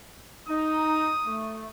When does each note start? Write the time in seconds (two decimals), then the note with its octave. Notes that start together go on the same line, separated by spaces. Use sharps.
0.49 D#4 D#6
1.26 A3